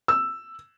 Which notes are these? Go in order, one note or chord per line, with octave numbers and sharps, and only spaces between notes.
E6